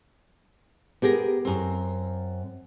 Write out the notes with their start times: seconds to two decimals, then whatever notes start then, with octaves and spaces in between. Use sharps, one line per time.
1.02 B3 G4 G#4 A#4
1.45 F#2 C4